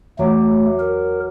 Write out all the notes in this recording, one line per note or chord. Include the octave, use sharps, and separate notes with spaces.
E2 F#3 A3 D6
A#4